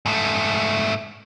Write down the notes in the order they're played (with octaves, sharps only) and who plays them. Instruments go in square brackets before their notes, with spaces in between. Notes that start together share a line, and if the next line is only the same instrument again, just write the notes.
[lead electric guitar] G#2 A3